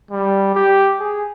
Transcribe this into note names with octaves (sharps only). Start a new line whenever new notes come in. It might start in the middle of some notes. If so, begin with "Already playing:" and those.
G3
G4
G#4